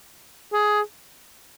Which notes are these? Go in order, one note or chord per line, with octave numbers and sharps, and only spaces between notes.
G#4